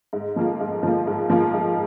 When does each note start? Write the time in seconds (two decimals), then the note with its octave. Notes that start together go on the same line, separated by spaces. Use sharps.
0.13 G#2
0.36 F3 A#3 F4
0.60 G#2
0.83 F3 A#3 F4
1.07 G#2
1.30 F3 A#3 F4
1.53 G#2